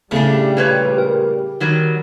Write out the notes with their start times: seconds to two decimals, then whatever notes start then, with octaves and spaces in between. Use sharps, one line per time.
0.11 A2 C#3 G3 A3 D4
0.57 A#2 B4 C#5
0.98 A#4
1.60 D#3 F#3 G3